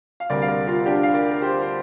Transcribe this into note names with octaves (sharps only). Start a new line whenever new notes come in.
F5
D2 C3 G3 A#4 D5
F5
A#4 D5
F4 A#4
D4 G4
F5
A#4 D5
A#4
G4 C5
C5